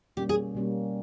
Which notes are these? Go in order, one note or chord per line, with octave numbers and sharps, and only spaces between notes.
B2 G3 A#3 C#4 G4
G#4
B2 G3 A#3 C#4